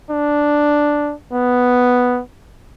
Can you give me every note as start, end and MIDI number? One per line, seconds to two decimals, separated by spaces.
0.11 1.15 62
1.33 2.21 59